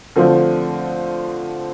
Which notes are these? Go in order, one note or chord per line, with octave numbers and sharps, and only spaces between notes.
D3 F3 A3 C4